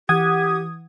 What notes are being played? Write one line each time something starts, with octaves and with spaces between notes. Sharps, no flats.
E3 G4 F#5 D#6 G#6